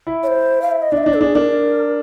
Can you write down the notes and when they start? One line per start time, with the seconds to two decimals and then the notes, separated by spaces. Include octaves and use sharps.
0.07 E4
0.23 C#5
0.27 C5
0.62 F5
0.71 E5
0.82 D#5
0.92 D4 D5
0.97 E5
1.03 D4 D#5
1.14 A4
1.21 D4 G#4
1.35 D4 A#4